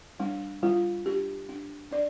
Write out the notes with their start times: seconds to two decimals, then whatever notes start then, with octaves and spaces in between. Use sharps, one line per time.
0.19 G3 D4
0.63 G3 F4
1.06 D4 G4
1.49 D4
1.91 D4 D5